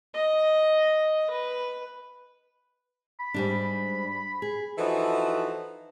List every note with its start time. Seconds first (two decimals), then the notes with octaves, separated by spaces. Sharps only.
0.14 D#5
1.31 B4
3.20 B5
3.34 G#2 G3 D4
4.42 G#4
4.78 E3 F3 D#4 F#4 A4 E5